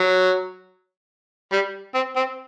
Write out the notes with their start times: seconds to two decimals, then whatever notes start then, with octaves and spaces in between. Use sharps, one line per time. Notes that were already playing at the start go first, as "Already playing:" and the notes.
Already playing: F#3
1.52 G3
1.94 C4
2.16 C4